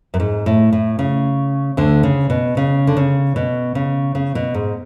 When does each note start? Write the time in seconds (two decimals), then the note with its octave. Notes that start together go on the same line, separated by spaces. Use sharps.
0.14 F#2
0.20 G#2
0.46 A2
0.73 A2
0.99 C#3
1.77 D2 D3
2.03 C#3
2.30 B2
2.57 C#3
2.87 D3
2.97 C#3
3.36 B2
3.75 C#3
4.15 C#3
4.35 B2
4.54 G#2